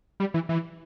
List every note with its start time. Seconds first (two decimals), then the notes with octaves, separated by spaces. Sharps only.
0.20 G3
0.34 E3
0.49 E3